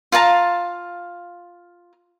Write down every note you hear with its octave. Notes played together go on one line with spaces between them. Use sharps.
F4 F5 A5 A#5